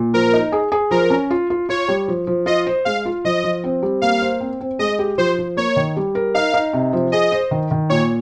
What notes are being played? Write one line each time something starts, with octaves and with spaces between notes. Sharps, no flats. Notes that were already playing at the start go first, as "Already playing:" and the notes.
Already playing: A#2
F3 A#4
D#4
G#4
G#4
F3 A#4
C#4
F4
F4
F4 C#5
G3
F3
F3
F4 D#5
C5
G#3 F5
F4
F3 D#5
F3
C4
G3
A#3 F5
C5
C4
C4
G#3 D#5
G4
F3 C5
F3
A#3 C#5
D#3
G3
A#4
D#4 F5
D#4
C3
F3
G#4 D#5
C5
D#3
D#3
A#2 C#5